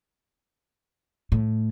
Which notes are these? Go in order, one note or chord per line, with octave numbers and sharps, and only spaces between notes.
A2